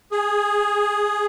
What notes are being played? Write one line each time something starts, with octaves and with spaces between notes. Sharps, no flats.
G#4